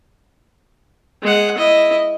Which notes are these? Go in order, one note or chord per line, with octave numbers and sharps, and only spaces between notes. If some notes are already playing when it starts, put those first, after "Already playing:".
G#3 F#5
E4 D#5